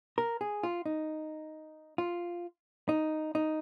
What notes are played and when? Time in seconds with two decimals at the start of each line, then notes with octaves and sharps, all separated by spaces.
0.18 A#4
0.41 G#4
0.63 F4
0.86 D#4
1.98 F4
2.89 D#4
3.35 D#4